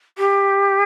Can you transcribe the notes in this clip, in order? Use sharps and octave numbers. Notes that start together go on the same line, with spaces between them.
G4